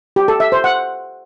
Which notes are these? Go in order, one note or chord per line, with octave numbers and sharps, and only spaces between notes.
G4
A4
E5
C5
F#5